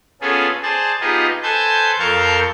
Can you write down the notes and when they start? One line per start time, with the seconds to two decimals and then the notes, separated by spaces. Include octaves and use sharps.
0.21 B3 C#4 F4 G#4 A4
0.63 G#4 C5 D5 A5
1.01 B3 D#4 F4 G4 G#4 D#5
1.43 A4 B4 C5 G#5 A5 G6
1.99 F2 A4 A#4 F5 C#6 G6